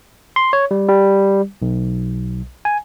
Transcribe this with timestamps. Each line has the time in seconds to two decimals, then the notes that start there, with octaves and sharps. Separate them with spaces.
0.36 C6
0.53 C#5
0.71 G3
0.89 G3
1.62 B1
2.65 G#5